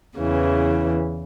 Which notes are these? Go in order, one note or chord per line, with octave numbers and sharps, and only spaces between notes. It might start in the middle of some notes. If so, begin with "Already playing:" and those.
E2 C#3 E3